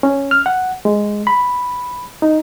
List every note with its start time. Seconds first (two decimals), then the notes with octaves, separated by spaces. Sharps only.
0.03 C#4
0.31 F6
0.46 F#5
0.85 G#3
1.27 B5
2.22 D#4